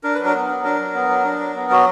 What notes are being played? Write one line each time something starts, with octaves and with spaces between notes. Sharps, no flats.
D4 A#4
F#3 B4
A#4
B3
F#3
D4 A#4
F#3
B3
F#3
D4
F#3
B3
F#3 F#4